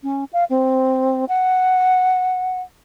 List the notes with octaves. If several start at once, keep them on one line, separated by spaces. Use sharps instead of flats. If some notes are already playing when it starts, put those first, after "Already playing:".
C#4
F5
C4
F#5